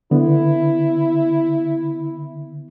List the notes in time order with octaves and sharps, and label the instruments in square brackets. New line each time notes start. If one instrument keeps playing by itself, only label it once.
[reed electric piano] D3 B3 [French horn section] E4